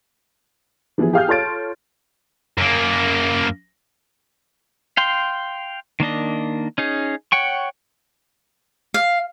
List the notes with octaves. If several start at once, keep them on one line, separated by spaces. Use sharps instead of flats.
E3 F3 B3 E4 G#4
G4 G#4 F5 D#6 F6 G6
F4 A4 C#5 C6 A6 D7
F#2 A#3
F5 G5 C6
D#3 A#3 D4 D#5
C#4 D#4 G#4
C#5 F#5 G5 C#6
F5